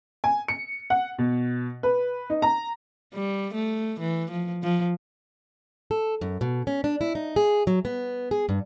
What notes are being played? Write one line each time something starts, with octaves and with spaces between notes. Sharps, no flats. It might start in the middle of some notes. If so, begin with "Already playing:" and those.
G#5
C#7
F#5
B2
B4
D#4
A#5
G3
A3
E3
F3
F3
A4
F#2
B2
C#4
D4
E4
D#4
G#4
F#3
B3
G#4
G2